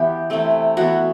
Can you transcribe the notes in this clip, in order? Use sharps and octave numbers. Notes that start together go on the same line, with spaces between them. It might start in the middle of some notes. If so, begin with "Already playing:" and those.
Already playing: E3 B3 G4
C3 E3 A3 C4
E3 B3 F#4